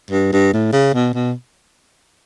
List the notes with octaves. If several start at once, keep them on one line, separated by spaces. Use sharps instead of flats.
G2
G2
A2
C#3
B2
B2